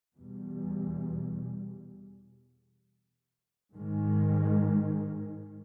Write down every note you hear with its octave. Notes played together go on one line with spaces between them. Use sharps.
E2 B2 G3
G#2 D#3 G#3